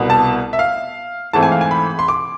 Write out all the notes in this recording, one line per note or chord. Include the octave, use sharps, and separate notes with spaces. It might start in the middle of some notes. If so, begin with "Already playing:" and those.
Already playing: C2 B2 B3
A5
E5
F5
G#2 E3 A3 C4 A5
G#5
F5
G#5
B5
C6
D6